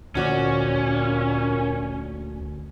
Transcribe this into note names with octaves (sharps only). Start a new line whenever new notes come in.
D2 A#2 C#4 F#4 D5